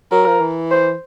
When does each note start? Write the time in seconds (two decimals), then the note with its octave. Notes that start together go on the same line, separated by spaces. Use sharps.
0.12 F#3 A#4
0.27 F3
0.41 E3
0.71 C5